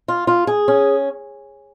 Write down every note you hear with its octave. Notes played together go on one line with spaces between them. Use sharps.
F4
F4
G#4
C#4